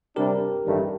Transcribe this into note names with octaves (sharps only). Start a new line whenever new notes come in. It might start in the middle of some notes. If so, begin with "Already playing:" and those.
C3 G3 D4 G4 A#4
A1 G2 D#3 A3